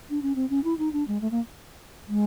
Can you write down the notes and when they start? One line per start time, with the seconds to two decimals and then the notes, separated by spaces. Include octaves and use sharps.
0.10 D4
0.22 C#4
0.36 C4
0.50 C#4
0.64 E4
0.78 D#4
0.93 D4
1.08 G#3
1.21 A3
1.31 A#3
2.08 G#3